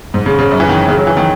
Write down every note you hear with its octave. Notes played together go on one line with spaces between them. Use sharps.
G#2
C#3
C#3
F#2
E3
D#3
C#3
F#3
E3
D#3